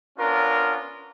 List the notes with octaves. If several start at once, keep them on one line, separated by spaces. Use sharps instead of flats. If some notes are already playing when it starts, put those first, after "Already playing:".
B3 C#4 D4 F4 A#4